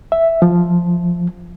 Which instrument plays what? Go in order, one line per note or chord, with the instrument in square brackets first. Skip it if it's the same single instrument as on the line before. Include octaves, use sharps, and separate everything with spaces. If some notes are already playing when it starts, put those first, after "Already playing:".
[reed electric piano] E5
F3